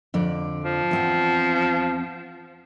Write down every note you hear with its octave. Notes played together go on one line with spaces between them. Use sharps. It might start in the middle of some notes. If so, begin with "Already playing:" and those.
F2 D3 D5
F3
E2 C4 F#5